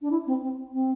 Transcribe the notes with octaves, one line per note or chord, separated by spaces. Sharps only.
D4
E4
C4
C4
C4